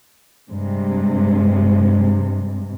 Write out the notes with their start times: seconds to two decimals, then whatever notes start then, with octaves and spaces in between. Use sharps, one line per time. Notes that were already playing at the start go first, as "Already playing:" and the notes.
0.50 G2 C3 G#3